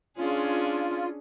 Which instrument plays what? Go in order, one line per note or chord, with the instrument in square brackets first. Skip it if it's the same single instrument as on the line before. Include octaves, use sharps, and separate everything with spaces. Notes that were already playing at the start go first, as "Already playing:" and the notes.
[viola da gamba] C#4 D4 G#4 [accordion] F4